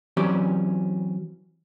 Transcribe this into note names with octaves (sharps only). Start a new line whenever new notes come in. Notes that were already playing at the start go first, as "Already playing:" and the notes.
E3 F#3 C4 C#4 G4 D5